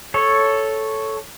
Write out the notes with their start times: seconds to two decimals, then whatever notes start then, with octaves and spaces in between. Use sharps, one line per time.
0.14 A4 C#5